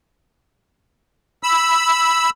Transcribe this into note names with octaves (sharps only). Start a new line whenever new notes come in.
B5 E6